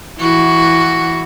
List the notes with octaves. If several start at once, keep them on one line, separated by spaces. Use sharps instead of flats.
E3 F#4